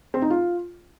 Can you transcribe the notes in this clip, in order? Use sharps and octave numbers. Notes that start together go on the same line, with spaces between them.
C4
D#4
F4